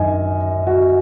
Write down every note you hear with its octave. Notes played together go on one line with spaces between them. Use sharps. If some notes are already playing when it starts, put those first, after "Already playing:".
Already playing: F#2 D#3 D#5 G#5
F#4